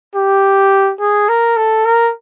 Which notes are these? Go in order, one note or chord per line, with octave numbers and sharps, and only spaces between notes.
G4
G#4
A#4
A4
A#4